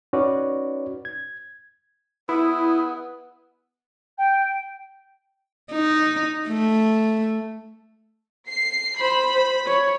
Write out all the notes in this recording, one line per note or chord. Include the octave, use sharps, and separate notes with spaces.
C#4 D#4 F#4 B4 C#5 D5
G#6
B3 E4 D#6
G5
D#4
A3
C7
C5 B5
C#5